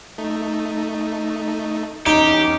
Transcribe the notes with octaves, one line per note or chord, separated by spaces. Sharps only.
A3 D#4
E2 C#4 D#4 G4